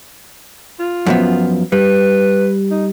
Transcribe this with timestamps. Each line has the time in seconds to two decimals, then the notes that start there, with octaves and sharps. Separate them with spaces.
0.79 F4
1.06 F#2 F3 B3
1.72 G3 B4
2.71 D#4